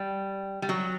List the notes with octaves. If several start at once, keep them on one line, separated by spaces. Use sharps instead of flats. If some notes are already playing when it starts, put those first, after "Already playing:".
Already playing: G3
G3
F#3